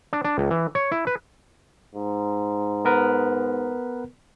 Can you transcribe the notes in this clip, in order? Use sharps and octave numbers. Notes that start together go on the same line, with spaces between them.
D4
D4
C#2
E3
C#5
E4
B4
G#2
B3 A#4 B4